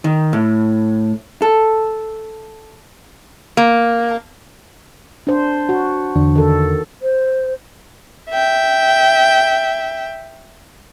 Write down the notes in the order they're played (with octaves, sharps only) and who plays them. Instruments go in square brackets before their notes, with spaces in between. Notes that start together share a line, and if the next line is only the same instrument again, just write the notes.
[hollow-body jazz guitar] D#3
A2
A4
[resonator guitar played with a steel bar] A#3
[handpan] D4 C5
F#4
[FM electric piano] E2 D3 D4
[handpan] D#3 A4
[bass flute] C5
[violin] E5 G5